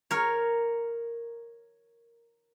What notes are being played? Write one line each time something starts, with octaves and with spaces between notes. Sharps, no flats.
A#4 C#5